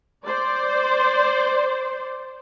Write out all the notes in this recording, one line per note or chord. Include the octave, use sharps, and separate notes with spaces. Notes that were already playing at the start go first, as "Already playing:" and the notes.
C5 D5